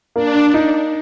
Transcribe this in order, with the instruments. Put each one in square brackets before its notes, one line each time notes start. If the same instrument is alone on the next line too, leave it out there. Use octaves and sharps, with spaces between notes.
[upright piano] A#3 [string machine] D4
[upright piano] D#4